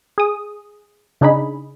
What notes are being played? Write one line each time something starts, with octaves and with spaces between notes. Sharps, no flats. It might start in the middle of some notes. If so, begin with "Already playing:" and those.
G#4 D#6
C#3 D4 D#4 G#4 B5